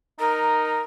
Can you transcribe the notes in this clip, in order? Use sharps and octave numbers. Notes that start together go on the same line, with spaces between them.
D#4 A#4